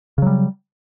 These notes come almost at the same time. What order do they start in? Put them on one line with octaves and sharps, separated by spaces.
C#3 F#3 G3